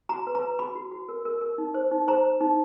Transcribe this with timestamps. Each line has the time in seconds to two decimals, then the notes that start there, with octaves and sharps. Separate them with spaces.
0.09 F#4 A#5
0.27 B4
0.35 A#5
0.42 B4
0.59 F#4 B5
0.75 F#4
0.92 F#4
1.09 A#4
1.25 A#4
1.41 A#4
1.58 D#4
1.74 C5
1.91 D#4
2.08 C5 A#5
2.24 C5
2.41 D#4